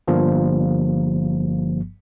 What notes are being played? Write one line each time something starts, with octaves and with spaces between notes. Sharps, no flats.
G1 G2 F3 A#3